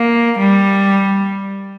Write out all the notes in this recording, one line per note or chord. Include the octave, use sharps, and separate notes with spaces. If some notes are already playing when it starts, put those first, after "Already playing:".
Already playing: A#3
G3